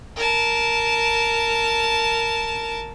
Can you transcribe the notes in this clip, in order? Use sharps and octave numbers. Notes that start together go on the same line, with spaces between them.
A#4 A5